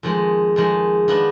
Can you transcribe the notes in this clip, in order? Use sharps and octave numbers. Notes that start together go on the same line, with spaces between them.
F2 D#3 G#3
F2 D#3 G#3
D#3 B3 D4